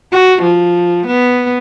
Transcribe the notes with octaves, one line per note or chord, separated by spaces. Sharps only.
F#4
F3
B3